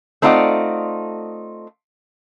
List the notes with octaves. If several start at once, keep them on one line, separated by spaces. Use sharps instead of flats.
A3 C4 D#4 F4 D5 F#5